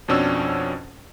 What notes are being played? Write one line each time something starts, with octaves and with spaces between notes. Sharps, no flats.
F2 B2 C#4 D4 E6